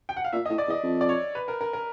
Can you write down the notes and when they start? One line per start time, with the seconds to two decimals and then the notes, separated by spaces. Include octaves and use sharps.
0.09 G5
0.17 F#5
0.25 F5
0.33 A#2 E5
0.46 D#5
0.50 A2
0.58 D5
0.67 E2
0.70 D#5
0.83 F2
1.01 D5
1.09 C#5
1.35 B4
1.48 A#4
1.61 A#4
1.73 A#4